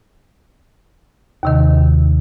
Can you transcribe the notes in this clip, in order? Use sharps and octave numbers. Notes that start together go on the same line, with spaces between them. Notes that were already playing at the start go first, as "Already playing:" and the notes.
D#2 C3 D#3